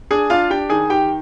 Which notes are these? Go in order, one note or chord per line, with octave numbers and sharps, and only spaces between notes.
D4 G#4 G#5
D4 F4 F5
D4 G4 G5
D#3 G#4 G#5
D#3 G4 G5